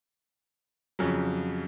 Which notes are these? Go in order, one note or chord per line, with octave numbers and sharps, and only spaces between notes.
F2 C#3 F#3